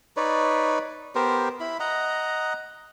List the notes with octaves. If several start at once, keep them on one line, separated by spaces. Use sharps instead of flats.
D#4 B4 C#5 D5
B3 G4 A#4 C5
E4 B5
D#5 F#5 A#5